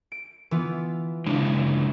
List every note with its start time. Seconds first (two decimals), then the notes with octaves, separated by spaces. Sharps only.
0.12 D7
0.51 E3 B3 F4
1.26 C#3 E3 G#3 D4